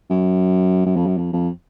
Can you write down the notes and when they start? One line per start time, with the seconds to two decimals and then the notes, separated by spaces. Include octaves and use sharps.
0.10 F#2
0.86 F#2
0.96 F2
1.06 F#2
1.18 F2
1.33 F2